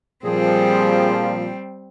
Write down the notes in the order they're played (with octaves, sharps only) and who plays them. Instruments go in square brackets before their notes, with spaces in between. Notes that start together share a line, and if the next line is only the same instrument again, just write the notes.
[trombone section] A#2 F3 [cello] G3 C4 [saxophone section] G#4